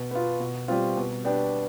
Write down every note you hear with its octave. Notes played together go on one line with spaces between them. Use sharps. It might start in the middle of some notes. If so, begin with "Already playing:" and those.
Already playing: B2
B3 F4
B2
G3 C4 F4
B2
B3 D4 G4